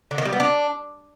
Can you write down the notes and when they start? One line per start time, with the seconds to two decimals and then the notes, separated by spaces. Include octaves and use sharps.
0.11 D3
0.18 D#3
0.25 G3
0.33 B3
0.40 D4